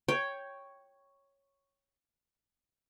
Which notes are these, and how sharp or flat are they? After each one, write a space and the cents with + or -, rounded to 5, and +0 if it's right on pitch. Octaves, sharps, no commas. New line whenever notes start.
C#5 +0 G5 +0